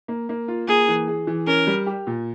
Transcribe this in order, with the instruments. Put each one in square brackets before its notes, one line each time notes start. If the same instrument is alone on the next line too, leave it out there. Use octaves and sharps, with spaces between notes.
[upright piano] A#3
A#3
F4
[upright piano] A#3 [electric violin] G#4
[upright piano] E3
G#4
E3
[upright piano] C#4 [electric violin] A#4
[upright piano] G3
G4
A#2